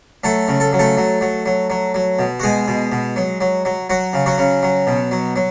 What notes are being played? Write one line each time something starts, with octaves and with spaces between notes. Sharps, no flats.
F#3 A3 A4
C#3
A4
F#3
A3 A4
F#3
F#3
F#3
F#3
F#3
B2
F#4
B2 G#3 G#4
B2
B2
F#3
F#3
F#3
F#3 F#4
C#3
F#3 F#4
C#3
F#3
B2
F#3
F#3